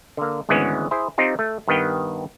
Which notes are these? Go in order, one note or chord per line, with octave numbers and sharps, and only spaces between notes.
D3 A#3
G#1 D2 E3 G#3 B3 C#4
E4 G#4 C5
C4 D#4 F4 G4
A3
G2 D#3 B3 B4 G5